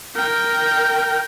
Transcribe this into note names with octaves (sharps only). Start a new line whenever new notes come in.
A#4 G5